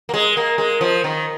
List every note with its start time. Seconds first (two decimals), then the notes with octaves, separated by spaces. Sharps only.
0.09 A#3
0.14 G#3
0.37 A#3
0.58 G#3
0.81 F3
1.04 D#3